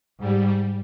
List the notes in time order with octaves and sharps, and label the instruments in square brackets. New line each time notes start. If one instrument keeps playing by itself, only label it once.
[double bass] G#2 [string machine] G3